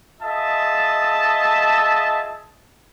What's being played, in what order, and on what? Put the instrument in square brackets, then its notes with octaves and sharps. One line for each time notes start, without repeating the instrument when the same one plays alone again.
[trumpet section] F4 G#4 D#5 E5 A5